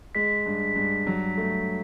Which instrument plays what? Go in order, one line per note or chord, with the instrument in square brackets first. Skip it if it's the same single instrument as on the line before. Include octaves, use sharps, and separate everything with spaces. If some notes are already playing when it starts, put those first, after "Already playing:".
[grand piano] G#3 [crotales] B6
[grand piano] G2
G2
F#3
A3